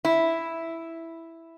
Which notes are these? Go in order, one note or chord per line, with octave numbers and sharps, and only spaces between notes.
E4